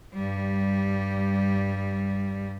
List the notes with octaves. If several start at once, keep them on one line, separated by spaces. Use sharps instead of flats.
G2 G3